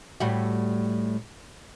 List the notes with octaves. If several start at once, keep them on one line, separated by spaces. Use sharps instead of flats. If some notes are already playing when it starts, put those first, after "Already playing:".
A2 G3 F#4